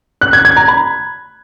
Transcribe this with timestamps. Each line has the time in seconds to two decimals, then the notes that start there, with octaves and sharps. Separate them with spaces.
0.21 F#6
0.33 G#6
0.45 G#6
0.56 A#5
0.68 B5